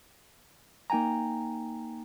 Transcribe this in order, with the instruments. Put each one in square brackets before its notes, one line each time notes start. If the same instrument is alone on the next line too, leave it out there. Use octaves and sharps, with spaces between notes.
[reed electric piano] A#3 D#4 G5 G#5 A#5